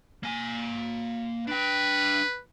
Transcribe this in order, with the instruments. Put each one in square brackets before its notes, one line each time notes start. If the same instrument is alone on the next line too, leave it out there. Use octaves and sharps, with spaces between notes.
[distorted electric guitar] A#3 G#5
[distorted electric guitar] D4 G5 [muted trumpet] B4